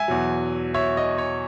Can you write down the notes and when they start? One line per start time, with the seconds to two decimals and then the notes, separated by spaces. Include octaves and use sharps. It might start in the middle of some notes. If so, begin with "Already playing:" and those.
Already playing: E5 G#5
0.08 E2 B2 F#3
0.74 C#5 E5
0.97 D#5
1.18 C#5